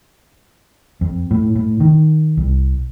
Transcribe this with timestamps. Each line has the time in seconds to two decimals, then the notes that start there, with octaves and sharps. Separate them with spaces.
1.01 F2
1.31 A2
1.55 A2
1.80 D#3
2.37 C2